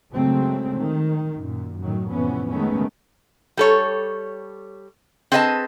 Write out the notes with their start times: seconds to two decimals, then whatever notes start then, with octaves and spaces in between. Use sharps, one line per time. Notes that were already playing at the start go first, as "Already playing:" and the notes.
0.12 C#3 F#3 G#3 A3 C4
0.77 D#3
1.36 F#2 A#2
1.80 A2 D#3 F#3
2.09 F2 A2 C3 E3 B3 C#4
2.51 D#3 G#3 A3 B3 C#4
3.57 G3 A4 C#5
5.32 C4 G#4 B4 D#5 E5 A5